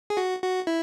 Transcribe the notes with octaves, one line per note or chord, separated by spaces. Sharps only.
G#4
F#4
F#4
E4